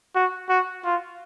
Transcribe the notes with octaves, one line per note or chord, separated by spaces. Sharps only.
F#4
F#4
F4